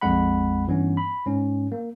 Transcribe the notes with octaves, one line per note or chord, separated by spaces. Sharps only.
A#1 F2 F3 G#3 F#5 B5
G2 E3 B3 C#4
B5
G#2 C#4
A#3